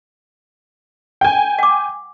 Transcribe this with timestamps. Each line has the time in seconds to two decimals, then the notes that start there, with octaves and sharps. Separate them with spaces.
1.21 G5 G#5
1.59 F#5 D6